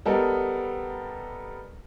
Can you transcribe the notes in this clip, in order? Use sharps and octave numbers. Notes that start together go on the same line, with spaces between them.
G3 B3 A4 A#4 D#5